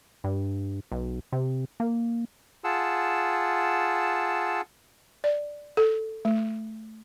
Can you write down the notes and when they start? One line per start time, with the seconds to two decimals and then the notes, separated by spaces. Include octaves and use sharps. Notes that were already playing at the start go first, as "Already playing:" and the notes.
0.24 G2
0.92 B1
1.32 C3
1.80 A#3
2.64 F4 G#4 F#5 A5 E6
5.24 D5
5.77 A4
6.25 A3